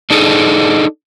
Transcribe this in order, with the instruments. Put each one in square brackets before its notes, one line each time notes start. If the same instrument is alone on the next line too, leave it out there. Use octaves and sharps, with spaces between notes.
[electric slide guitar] D4 D#4 G#4 A4 D#5